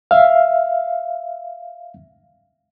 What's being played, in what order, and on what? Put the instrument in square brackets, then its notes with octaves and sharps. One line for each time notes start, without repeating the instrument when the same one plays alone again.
[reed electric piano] E5 F5